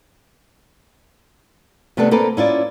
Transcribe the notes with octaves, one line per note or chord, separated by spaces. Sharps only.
C3 A3 B3 D4 A4
A#3 C4 A4 B4
C#4 E4 F4 D5